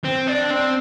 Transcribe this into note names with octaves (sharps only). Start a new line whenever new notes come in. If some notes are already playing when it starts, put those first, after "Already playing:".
C4
D4
C4